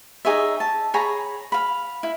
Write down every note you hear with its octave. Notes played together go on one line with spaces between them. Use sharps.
D#4 G#4 C#5 E5
A5
G#4 C#5 A#5 B5
F5 B5
E4